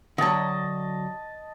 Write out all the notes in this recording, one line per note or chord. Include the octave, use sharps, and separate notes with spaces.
D3 F#3 D#5 A5